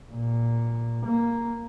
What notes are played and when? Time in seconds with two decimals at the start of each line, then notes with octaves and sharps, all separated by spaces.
0.12 A#2
1.06 A#3